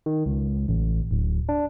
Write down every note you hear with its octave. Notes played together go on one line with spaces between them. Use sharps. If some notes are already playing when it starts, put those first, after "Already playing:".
D#3
C#2
A1
D1
D4